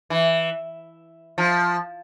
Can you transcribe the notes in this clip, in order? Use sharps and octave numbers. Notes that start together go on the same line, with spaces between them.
E3
F3